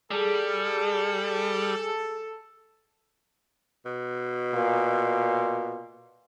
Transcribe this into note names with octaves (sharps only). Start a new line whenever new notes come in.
G3 G#4 A4
B2
A#2